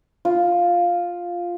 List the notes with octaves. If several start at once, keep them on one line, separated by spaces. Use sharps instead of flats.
F4